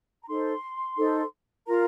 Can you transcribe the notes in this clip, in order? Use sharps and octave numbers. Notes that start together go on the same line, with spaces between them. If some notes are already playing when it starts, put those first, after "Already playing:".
A#5
D#4 A4 C5 C6
D#4 A4 C5
F4 A#4 A#5